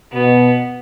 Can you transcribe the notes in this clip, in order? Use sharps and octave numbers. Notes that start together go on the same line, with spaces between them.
B2 B3